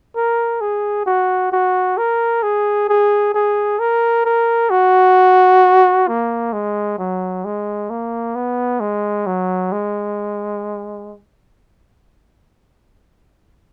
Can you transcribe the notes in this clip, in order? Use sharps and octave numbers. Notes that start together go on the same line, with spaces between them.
A#4
G#4
F#4
F#4
A#4
G#4
G#4
G#4
A#4
A#4
F#4
A#3
G#3
F#3
G#3
A#3
B3
G#3
F#3
G#3